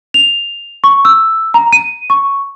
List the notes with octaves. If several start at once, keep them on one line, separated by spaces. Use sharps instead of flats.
F7
C#6
E6
A#5
D#7
C#6